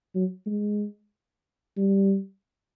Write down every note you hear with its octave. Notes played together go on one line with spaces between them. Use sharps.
F#3
G#3
G3